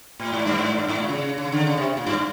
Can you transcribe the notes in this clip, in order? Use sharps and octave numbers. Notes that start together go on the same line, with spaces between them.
A2
G#2
G2
G#2
G2
G#2
A#2
C#3
C#3
D3
C#3
C3
A#2
G2